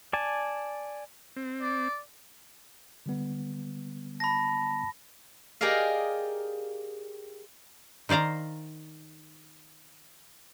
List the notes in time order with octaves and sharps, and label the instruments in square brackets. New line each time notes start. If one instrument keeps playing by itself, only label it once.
[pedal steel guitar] D5 G#5 A5
[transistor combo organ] C4
[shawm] D5
[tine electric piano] D3 G3 B3
[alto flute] A5 [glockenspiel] B5 A#6
[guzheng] G4 G#4 A#4 D5 D#5 F5
[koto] D#3 C5 D5 F5 A#5